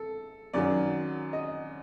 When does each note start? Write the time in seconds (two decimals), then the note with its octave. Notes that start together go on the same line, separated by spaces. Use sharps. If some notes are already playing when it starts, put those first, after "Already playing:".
Already playing: A4
0.53 F#2 D#3 F#3 D5
1.33 D#5